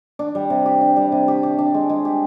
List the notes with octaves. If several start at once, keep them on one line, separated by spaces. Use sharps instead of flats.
D4
G3
C3
G4
D4
G3
C3
G4
G4
D4
G#3
G#3
G4